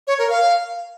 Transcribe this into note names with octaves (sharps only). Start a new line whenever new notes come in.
C#5
A#4
F5